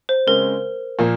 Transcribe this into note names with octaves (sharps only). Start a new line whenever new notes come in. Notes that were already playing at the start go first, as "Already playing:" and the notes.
C5
C#3 G#3 C4 A#4
A#2 F3 A#3